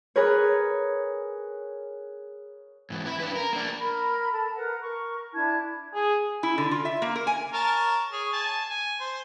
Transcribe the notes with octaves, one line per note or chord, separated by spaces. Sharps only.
G#4 A#4 B4 C#5
G#2 E3
E4
D4 B4
A#4
A#3 D4
A#4 B5
A4
A#4 B4 F#5
A#4 C#6
D4 E4 A5 G#6
G#4
E4
D3
F4
E5
A#3
A#4
G#5
A#4 C#5 A5
G#4 C#5
G#5 A5
G#5
C5